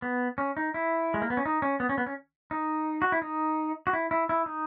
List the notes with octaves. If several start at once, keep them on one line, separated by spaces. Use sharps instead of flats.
B3
C#4
D#4
E4
G#3
A#3
B3
C#4
D#4
C#4
B3
C#4
B3
C#4
D#4
F#4
E4
D#4
F#4
E4
E4
E4
D#4